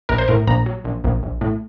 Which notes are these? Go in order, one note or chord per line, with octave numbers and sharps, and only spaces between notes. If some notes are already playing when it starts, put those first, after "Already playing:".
A#1 A#4
C5
A2 A#4
A#1 A#5
F#3
A#1
A#1
A#1
A2